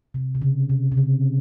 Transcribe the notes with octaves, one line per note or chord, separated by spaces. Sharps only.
C3
C3
C#3
C3
C3
C#3